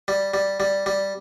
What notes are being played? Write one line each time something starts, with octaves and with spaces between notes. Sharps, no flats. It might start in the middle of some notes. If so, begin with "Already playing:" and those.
G3
G3
G3
G3